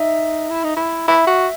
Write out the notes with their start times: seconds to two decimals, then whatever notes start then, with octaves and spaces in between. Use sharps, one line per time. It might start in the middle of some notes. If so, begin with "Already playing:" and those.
Already playing: D#4 E5
0.50 E4
0.64 D#4
0.77 E4
1.08 E4 E5
1.27 F#4